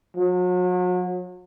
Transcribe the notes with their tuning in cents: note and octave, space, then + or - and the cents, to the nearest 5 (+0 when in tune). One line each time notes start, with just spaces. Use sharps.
F#3 -40